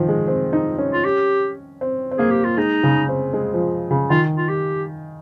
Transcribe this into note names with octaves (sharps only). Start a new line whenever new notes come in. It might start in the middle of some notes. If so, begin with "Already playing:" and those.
Already playing: D#3 F3
G#3
C4
D#4
C#4
F4
G4
C4
C4
A#3 G#4
G4
F4
G#3 D#4
C#3
C4
G#3
F3
C#3
D#3 F4
F4
G4